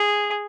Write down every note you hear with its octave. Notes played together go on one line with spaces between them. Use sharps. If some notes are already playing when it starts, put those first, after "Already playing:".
Already playing: G#4